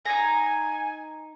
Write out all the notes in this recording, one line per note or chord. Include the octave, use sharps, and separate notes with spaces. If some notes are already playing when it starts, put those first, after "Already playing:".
D#4 G#5 A#5